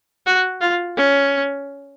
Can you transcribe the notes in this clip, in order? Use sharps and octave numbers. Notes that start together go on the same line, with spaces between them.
F#4
F4
C#4